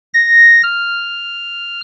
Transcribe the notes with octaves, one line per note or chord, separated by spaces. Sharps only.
A#6
F6